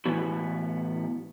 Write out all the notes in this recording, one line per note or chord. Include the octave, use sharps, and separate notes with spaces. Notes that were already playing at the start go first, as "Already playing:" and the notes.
A2 E3 B3 E4 F#4